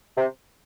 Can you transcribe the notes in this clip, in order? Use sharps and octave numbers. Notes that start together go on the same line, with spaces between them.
C3